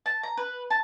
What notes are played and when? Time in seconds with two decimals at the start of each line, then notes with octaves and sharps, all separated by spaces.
0.06 A5
0.23 A#5
0.37 B4
0.70 A5